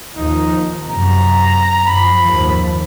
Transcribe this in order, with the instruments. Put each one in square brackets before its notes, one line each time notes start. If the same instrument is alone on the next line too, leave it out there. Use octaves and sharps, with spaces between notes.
[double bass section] D#2 F3 [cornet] D#4
[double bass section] F#2 C3 [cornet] A#5
[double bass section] F#2 F3 [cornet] B5
[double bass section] D#2 G#2 F3